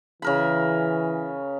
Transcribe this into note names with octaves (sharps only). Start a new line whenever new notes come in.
C#3 E3 A#4 B5